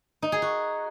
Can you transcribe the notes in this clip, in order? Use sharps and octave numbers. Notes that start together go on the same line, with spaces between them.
D#4
G#4
F#4